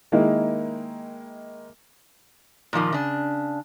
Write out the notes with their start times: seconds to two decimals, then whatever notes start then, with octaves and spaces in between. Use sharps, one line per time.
0.12 D#3 G#3 A#3 D#4 E4
2.73 A#2 D#3 F3 A#3
2.93 C#3 D4